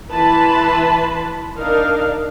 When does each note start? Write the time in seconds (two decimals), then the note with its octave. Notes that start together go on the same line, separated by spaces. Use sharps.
0.11 E3 B4 A5 B5 C6
1.58 D4 D#4 A#4 F5